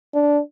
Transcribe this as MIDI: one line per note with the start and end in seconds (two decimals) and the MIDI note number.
0.14 0.40 62